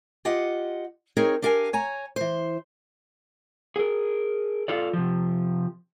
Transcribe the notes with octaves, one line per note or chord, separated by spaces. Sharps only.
F4 G4 D#5 F#5
C4 D#4 G#4 A#4 C#5
D4 G4 A#4 F5 F#5 G#5
C#5 G#5 A#5
E3 C5
G#4 A#4
F4 A4 D5
C3 F3